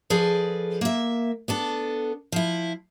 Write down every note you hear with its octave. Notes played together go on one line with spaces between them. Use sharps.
F3 G#4 A4 B4 D5
A#3 E5
B3 D4 A4
F3 E4